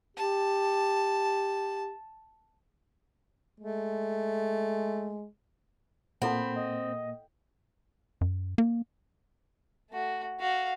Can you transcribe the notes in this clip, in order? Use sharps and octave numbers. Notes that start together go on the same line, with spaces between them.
G4 A5
G#3 A3
A#2 A#3 C4 E4 A4 F#5 B5
D#5
F#2
A#3
A3 F#4
F#4 F5